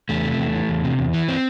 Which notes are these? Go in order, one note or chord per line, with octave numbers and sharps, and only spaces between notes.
E2 A3
C3
E2
E3
E2
C3
E2
E3
C4